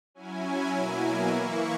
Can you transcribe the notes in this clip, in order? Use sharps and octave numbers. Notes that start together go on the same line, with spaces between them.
F#3 C#4 E4 G#5
B2 F#3 A#3 E4
E3 A#3 E4 C#6